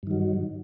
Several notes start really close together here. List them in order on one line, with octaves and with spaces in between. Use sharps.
G2 D#3 F#3